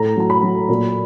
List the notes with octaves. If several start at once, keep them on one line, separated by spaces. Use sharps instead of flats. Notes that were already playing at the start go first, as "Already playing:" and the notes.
Already playing: A2 A#5
F#3 A#5
B5
F#3
A#2